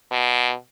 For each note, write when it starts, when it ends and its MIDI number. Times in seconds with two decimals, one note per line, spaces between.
0.12 0.53 47